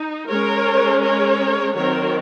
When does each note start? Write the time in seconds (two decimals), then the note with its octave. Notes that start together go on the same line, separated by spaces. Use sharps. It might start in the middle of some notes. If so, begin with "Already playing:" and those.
Already playing: D#4
0.28 G#3 C#4 A#4 C#5
1.02 A#4 C#5
1.75 D#3 F#3 C4 A#4 C#5